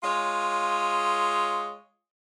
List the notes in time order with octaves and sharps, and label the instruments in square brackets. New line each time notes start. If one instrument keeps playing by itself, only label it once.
[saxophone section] G#3 F4 C#5